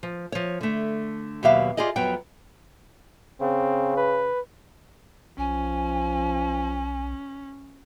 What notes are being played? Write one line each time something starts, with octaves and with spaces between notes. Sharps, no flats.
F3
F3 C#5
D3 A3
D#2 B2 F#3 G4 E5 F5
F4 G4 G#4 D5 D#5
F2 F#3 B3 C#5 G5
C#3 C4
B4
B1 F3 C#4 G#5